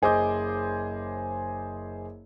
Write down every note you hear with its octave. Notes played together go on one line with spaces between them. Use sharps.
F#1 G#4 C5 D#5 D6 G6